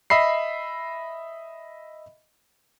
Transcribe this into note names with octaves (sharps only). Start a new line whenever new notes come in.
D#5 E5 B5 C7